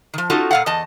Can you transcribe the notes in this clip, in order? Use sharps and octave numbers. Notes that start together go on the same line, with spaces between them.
D#3 F3
C#4 D#4 F4 F#4 A4
A#2 F5 F#5
E2 D#5 A5